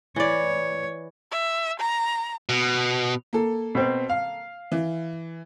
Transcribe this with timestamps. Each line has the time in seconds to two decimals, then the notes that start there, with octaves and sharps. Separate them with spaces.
0.16 E3 C#5 D5
1.31 E5
1.79 A#5
2.49 B2
3.33 A#3 A4
3.75 B2 C4
4.09 F5
4.72 E3